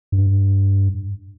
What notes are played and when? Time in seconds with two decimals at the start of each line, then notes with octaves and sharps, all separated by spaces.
0.12 G2